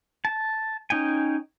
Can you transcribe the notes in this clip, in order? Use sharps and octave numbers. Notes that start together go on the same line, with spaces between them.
A5
C#4 D#4 G5 G#5